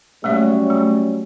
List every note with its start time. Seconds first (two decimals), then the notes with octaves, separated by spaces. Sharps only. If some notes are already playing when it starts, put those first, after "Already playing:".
0.24 F#3 G3 A3 A#3 C#4 E5
0.70 A3